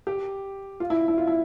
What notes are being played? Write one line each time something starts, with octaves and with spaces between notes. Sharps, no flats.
G4
F4
E4
E4
F4
E4